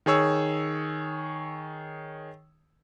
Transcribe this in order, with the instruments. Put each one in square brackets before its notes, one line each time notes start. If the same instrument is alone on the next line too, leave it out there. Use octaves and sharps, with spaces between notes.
[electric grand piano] D#3 G#4 C#5 E6